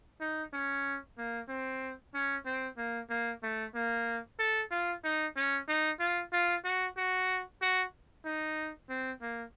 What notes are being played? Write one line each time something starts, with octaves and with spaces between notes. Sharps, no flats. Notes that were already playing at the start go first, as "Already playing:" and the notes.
D#4
C#4
A#3
C4
C#4
C4
A#3
A#3
A3
A#3
A4
F4
D#4
C#4
D#4
F4
F4
F#4
F#4
F#4
D#4
C4
A#3